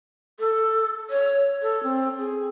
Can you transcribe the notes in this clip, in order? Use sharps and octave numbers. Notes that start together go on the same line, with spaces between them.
A4
C#5
A4
C4
G#4